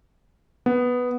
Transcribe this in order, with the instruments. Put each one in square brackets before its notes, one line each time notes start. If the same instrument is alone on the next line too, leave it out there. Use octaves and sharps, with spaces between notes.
[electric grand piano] B3